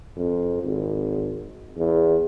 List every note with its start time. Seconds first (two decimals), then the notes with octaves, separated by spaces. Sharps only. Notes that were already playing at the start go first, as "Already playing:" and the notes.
0.17 F2
0.63 G#1
1.77 E2